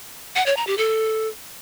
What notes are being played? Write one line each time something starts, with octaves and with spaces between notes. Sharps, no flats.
F#5
C#5
A#5
G4
A4